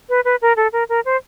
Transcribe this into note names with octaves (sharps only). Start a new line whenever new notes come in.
B4
B4
A#4
A4
A#4
A#4
C5